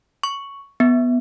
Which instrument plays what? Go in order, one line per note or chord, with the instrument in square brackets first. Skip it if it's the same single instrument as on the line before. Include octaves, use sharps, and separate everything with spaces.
[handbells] C#6
B3